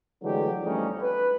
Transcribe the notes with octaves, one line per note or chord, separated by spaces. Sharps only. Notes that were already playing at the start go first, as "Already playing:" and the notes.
D3 E3 F#3 G#3 A3 G4
F2 F3 G3 A3 C#4 D#4
B4